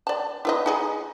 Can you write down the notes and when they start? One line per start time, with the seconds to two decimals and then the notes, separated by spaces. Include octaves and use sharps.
0.07 D5 A5
0.45 E4 B4 D#5
0.66 D#4 G#4 D#5